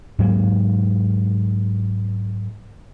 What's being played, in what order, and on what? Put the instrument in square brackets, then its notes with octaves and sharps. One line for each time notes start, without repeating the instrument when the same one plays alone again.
[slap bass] G#2 F#3 G#3 A#3